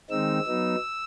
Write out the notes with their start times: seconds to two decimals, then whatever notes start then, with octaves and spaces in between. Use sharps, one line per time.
0.10 D#3 G#3 C4 D#4 E6
0.47 F#3 B3 D#4